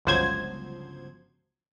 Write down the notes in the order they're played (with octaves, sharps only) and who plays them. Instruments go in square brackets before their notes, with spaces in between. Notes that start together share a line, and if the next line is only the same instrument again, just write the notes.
[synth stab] G1 C#2 F3 F#3 C5 G#6